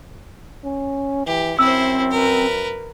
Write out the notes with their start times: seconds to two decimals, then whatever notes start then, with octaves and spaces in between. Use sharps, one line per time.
0.64 C#4
1.26 E3 G4
1.59 F#2 C4 E4 C5 E6
2.10 A#4 B4